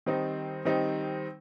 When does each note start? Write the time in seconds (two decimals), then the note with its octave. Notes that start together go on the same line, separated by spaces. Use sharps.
0.06 D#3 G3 C4 D#4
0.65 D#3 G3 C4 D#4